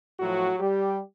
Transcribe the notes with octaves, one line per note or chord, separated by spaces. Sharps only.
A2 F3 F#3 F#4
G3 G4